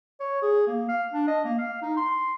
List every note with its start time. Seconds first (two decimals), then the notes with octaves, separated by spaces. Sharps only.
0.20 C#5
0.42 G#4
0.67 A#3
0.89 F5
1.13 D4
1.27 D#5
1.44 A#3
1.59 F5
1.82 D#4
1.97 C6